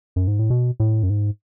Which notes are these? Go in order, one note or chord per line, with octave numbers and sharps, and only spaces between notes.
F#2
G#2
A2
B2
A2
F#2
G#2